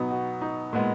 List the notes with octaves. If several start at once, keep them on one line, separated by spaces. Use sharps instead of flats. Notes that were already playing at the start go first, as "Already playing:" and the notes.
Already playing: B2 F#3 B3 D#4
F#4
D#4
A#2 G#3 B3